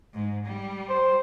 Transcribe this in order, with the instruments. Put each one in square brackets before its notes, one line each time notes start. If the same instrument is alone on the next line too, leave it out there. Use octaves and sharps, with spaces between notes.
[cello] G#2
G3
[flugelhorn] C5